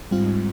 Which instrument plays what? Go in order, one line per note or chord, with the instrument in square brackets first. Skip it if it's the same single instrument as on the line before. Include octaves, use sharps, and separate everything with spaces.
[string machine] G#2 [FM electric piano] G3 C4 F4